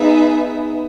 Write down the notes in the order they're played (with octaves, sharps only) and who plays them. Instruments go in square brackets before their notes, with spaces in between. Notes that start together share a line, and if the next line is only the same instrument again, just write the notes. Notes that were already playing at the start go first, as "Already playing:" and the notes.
Already playing: [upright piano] B3 [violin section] D#4 G#4 B4 E5